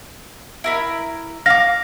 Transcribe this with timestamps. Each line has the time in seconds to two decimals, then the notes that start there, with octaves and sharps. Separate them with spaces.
0.64 E4 A#4 B5
1.46 F5 D6 A#6